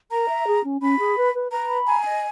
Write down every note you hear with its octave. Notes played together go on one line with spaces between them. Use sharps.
A#4 A#5
E5
G#4
C#4
C#4 B5
G#4
B4
B4
B4 A#5
B5
G#5 A#5
D#5